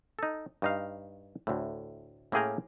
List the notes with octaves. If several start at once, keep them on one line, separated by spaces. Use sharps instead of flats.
D#4 A4
G2 D#4 F5
D2 A2
A2 A#3 C#4 G#4 G5 A#5